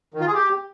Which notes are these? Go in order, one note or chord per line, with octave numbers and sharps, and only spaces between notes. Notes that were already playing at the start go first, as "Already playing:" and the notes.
D#3
F4
G#4
G4